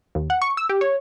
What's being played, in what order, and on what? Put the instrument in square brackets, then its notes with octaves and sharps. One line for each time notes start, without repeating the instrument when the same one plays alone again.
[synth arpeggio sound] D#2
F#5
C#6
E6
G4
C#5